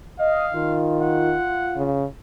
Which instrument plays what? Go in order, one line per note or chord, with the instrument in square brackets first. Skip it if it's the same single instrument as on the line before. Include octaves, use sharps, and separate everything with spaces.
[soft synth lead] D#5 [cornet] F5
[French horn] D#3 [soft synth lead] F4
[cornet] F#5
[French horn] C#3